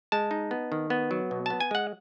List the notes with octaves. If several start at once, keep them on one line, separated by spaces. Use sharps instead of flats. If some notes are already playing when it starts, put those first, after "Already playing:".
G#3 A5
D#4
B3
D#3
B3
F#3
B2
B3 A5
G#5
G#3 F#5